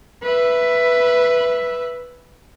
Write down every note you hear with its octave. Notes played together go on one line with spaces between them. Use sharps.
B4 E5